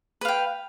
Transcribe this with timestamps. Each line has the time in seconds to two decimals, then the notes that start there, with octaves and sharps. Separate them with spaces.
0.21 B4
0.25 F5
0.28 G5